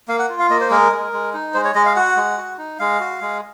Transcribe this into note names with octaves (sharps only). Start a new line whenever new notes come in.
A#3 F5
F#5
F4
F5
A#3 D#5
C5
G#3 A#4
G#3
G#3
D#4
G#3 C5
C#5
G#3 D#5
F5
F#4 F#5
G#3
F#4
D#4
G#3 F5
F#4
G#3